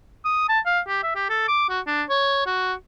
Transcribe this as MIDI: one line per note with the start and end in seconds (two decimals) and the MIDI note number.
0.25 0.48 87
0.49 0.59 81
0.66 0.80 77
0.88 1.00 67
1.03 1.11 76
1.16 1.25 67
1.30 1.48 69
1.48 1.69 86
1.69 1.80 66
1.87 2.03 62
2.09 2.44 73
2.46 2.73 66